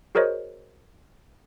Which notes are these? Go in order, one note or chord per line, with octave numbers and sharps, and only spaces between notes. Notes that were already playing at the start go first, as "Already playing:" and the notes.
F#4 G#4 A#4 C5 C#5 D#5